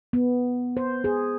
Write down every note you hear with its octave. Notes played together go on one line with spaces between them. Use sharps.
B3
C5
G#4